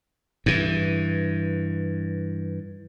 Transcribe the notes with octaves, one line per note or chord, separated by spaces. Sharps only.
G2 E3